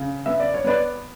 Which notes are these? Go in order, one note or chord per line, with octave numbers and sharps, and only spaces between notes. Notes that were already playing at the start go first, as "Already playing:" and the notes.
Already playing: C#3
B3 E5
D5
C#5
B3 B4 D5